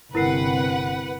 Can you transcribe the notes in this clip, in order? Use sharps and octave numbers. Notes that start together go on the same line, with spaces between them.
G1 C3 C4 E4 A#4 B4 F#5 C7